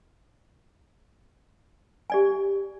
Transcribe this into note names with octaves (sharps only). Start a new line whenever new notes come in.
G4 D5 G#5